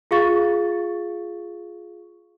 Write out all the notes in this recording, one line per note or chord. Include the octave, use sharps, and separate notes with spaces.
F4 G#4 F5 C#6 A6